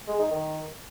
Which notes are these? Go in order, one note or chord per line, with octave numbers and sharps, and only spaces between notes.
G#3
D#4
D#3